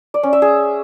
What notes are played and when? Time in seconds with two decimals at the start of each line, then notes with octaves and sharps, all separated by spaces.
0.14 D5
0.23 C#4
0.33 E5
0.42 G#4